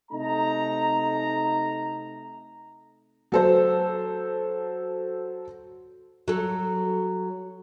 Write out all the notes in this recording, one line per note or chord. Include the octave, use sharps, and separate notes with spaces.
C3 A3 D#4 A#5
F#3 A4 C5
F#3 A4